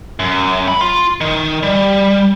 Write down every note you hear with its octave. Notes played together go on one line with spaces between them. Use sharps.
F#2
B5
F4
D#3
G3